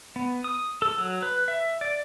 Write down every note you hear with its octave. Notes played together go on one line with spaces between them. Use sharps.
B3
D#6
A4
F#3
B4
E5
D5